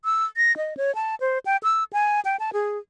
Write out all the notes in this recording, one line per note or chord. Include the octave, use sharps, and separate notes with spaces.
E6
A#6
D#5
C#5
A5
C5
G5
E6
G#5
G5
A5
G#4